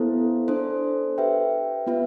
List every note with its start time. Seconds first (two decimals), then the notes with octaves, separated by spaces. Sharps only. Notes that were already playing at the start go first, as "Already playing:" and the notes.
Already playing: B3 E4 A4 C5
0.48 D4 A4 C5
1.18 G4 B4 E5 G5
1.87 B3 F4 B4 E5